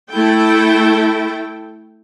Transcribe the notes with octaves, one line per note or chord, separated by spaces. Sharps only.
A3 E4 A4 G5